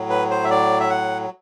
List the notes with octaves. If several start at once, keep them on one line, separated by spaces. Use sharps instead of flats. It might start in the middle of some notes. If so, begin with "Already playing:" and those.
Already playing: A2 F#3
B4
C5
E5
D5
E5
F#5